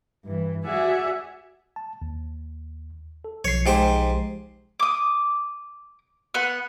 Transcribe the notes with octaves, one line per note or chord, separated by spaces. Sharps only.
G2 E3
F#4 G#4 D5 E5 F#5 G#5
A5
D#2
A4
B1 F3 C#5 C7
G#2 G4 C5
D6 D#6
B3 F#5